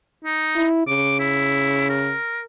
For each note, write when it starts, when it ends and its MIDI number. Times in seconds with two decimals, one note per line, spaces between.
0.25 0.66 63
0.56 0.86 64
0.87 2.15 49
0.87 1.15 86
1.20 1.88 64
1.89 2.41 70